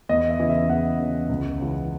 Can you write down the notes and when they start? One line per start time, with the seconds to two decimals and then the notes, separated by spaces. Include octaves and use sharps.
0.09 E2 D#5
0.29 E5
0.40 C#3 E3
0.49 E5
0.69 E2 F#5
0.99 C#3 E3
1.29 C#2
1.59 C#3 E3